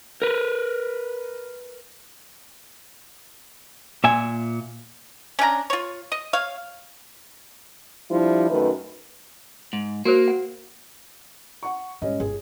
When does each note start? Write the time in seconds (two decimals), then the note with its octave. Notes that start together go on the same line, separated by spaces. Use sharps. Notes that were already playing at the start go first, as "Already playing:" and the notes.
0.22 A#4 B4
4.04 A#2 E5 G#5
5.39 C#4 D4 G5 A#5
5.70 F4 C#5
6.12 D#5
6.33 C#5 F5
8.11 F3 G3 D4 E4
8.50 F#2 D#3 A3 B4
9.73 G#2
10.05 A#3 F#4 A#4 C5
10.28 F#5
11.63 F#5 C#6
12.02 G#2 G3 C#4 D#5
12.20 G1 G#4